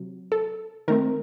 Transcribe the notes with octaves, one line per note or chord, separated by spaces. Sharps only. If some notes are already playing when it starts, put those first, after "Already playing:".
Already playing: C3 F#3
A4
D#3 A3 C4 A#4